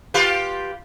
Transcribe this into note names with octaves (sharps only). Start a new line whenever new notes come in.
F4 G4 B4